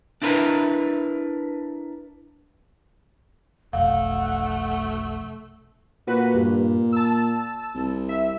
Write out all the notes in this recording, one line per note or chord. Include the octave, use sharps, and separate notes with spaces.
D4 E4 A#4 B4
F1 B1 A3 F5 F#5
A#2 F#4 B4
G2
A5 E6
C2
E5